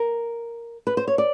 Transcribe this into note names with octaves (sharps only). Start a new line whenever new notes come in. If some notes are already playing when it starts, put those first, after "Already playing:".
Already playing: A#4
B4
C5
C#5
D5